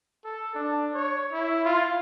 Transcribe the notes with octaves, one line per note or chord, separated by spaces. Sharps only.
A4
D4
C#5
E4
F4